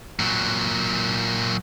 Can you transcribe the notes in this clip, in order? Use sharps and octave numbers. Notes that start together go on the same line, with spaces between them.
A#2 F#3